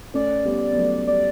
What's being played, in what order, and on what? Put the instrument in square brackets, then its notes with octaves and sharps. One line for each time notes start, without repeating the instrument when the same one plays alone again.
[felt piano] A3 C#4 [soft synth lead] D5
[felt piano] G3 B3
B3
F#3 A3
[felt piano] G3 [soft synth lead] D5